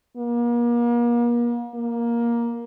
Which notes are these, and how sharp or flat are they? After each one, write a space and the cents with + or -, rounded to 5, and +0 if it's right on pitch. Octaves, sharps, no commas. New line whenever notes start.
A#3 +40
A#3 +10